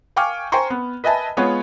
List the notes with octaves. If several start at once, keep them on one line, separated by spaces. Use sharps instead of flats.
F5 G5 G#5 C#6 D6 F6
C5 G5 G#5 A#5 C6 C#6
B3
B4 D#5 E5 G#5 A5 B5
G#3 B3 F4 C#5